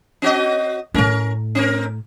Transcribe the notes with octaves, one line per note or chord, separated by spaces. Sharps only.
C4 F#4 D#5
A2 A3 C#4 A#4
C4 A#4